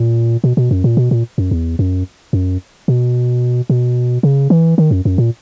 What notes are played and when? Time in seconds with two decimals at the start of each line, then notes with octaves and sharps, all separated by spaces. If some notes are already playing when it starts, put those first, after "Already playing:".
Already playing: A#2
0.44 B2
0.57 B2
0.71 F#2
0.84 A#2
0.97 B2
1.11 A#2
1.38 F#2
1.51 E2
1.79 F#2
2.33 F#2
2.88 B2
3.70 B2
4.23 C#3
4.50 E3
4.78 D#3
4.91 F#2
5.05 F#2
5.18 A#2